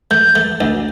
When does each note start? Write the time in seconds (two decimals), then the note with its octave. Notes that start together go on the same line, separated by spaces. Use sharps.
0.11 A3 G6
0.36 A3
0.61 D2